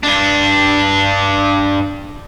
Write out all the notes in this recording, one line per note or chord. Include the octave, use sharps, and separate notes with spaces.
G2 D4